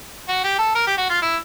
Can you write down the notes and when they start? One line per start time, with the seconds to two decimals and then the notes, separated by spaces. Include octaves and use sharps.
0.29 F#4
0.44 G4
0.59 A4
0.75 A#4
0.87 G4
0.98 F#4
1.10 F4
1.22 E4